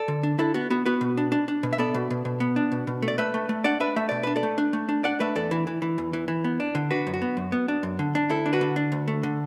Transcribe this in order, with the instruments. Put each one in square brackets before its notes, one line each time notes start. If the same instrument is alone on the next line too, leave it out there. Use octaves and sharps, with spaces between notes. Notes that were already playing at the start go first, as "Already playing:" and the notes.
Already playing: [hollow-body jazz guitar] A4 D5
D3
D4
D4 E4 A4
B3 F#4
B3 F#4
B3 F#4 B4
B2
D4
D4
D4
B2
E5
B3 A4 D5
B2
B2
B2
B3
D4
B2
B2
A3
D5
A3 B4 E5
A3
A3
D4 D5 F#5
D4 B4 E5
A3 E5
B2 D5
D4 B4
A4 D5
A3
D4
A3
D4
D4 D5 F#5
A3 B4 E5
E2 A4 D5
E3
E3
E3
E2
E3
E3
B3
D4
D3
D4 F#4 B4
F#2
F#4
B3
F#2
B3
D4
F#2
D3
D4
D2 E4 A4
D4
F#4 B4
D3
D4
D2
A3
D3